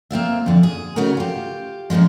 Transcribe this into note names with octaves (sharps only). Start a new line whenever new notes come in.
A#3 C4 F4 E5
F2 D3
G#4
C#3 A3 D#4 F#4 A#4
F4 G4
F#2 A#2 D3 F3 G#3